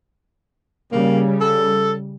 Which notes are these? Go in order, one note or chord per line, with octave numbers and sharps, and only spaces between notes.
C#3 G3 A#3
A4